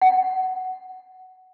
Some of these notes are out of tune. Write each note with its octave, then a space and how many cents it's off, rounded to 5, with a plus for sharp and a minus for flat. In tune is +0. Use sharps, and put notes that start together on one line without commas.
F#5 +10